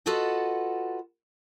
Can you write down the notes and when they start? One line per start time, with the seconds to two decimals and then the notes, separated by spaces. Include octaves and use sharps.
0.06 F4 F#4 A4 B4 D#5 F#5